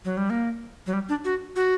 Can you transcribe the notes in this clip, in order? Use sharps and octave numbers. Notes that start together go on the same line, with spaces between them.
F#3
G3
A#3
F#3
G3
D4
F#4
F#4